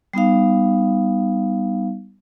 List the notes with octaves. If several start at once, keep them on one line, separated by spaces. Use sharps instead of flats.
G3 B3 D#4 F5